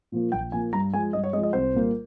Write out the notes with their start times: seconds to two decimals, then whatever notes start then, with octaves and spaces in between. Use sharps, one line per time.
0.12 A#2 F3 A#3
0.32 A#1 G5
0.52 A#2 F3 A#3 G#5
0.72 G2 A#5
0.94 F3 G#3 G#5
1.13 G2 D#5
1.24 C#5
1.33 G#3 D#5
1.38 F3
1.43 D#5
1.53 C2 C5
1.74 A#2 G3 A#3